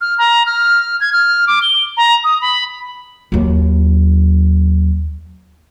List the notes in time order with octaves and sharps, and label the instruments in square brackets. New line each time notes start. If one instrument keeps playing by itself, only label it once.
[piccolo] F6
A#5
F6
G#6
F6
D6
G7
A#5
D#6
B5
[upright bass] D#2 F#3